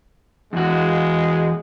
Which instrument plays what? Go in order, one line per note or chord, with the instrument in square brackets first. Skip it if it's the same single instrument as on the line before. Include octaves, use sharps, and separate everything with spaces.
[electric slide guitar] E2 F#4 [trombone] G#3